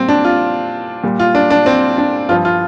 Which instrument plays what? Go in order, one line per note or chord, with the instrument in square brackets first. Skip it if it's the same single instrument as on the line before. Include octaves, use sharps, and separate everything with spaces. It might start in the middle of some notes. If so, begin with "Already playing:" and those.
Already playing: [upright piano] A#2 G3 C4
D4
F4
A#2 G3
F4
D4
D4
C4
D4
G2 F3 F4
F4